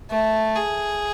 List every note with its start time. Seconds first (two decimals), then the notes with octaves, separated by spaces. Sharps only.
0.11 A3
0.55 G#4